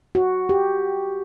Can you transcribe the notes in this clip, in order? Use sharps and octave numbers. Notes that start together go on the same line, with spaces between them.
F#4
G4